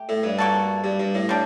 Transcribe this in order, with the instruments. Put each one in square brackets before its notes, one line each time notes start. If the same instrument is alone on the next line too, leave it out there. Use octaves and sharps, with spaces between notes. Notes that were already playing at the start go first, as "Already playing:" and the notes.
Already playing: [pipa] A3 G4
[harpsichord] A2
G2
[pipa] A#3 F#4 A4
[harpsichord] G2
G2
A2
[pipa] G3 D4